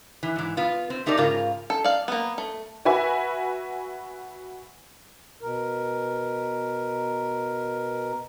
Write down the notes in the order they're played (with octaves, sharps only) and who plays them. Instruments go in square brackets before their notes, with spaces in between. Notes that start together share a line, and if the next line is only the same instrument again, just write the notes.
[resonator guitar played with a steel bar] E3
G#2 E3
B3 F4
C4
A3 D#4 G4 A#4 D5
G#2 C#3 F4 A#4
[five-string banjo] A4
D5 F5
A#3 B3
A3
[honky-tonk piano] F#4 B4 E5 G#5 B5
[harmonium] B2 A#4